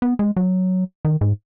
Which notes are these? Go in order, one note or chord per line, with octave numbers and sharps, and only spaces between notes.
B3
G#3
F#3
D#3
G#2